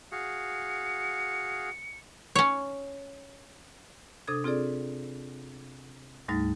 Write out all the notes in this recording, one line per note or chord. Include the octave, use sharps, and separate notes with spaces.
F#4 G#4 F5 C#7
C#4 C#5
C3 D4 A4 D#6 G#6
C4 F4 G#4 A4 D5
D2 G#2 G3 A3 D#4 A6